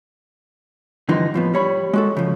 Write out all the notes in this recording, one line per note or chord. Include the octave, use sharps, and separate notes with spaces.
G2 D3 E3 F3 D#4
A2 F3 B3
G3 C#5 B5
G#3 F#4 A4
C#3 F3